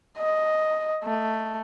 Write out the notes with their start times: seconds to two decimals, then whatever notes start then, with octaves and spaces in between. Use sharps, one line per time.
0.18 D#5
1.04 A3